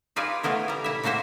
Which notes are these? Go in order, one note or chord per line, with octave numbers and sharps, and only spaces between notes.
D#4 F4 G#4 B4 D5
C#3 A3 B3 E4 A#4
G3 A#5
A#2 E4 E5
C#3 A#3 F#4 C5 E5